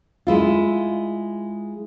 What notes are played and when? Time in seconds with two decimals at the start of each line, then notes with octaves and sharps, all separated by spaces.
0.27 G#3 E4 F4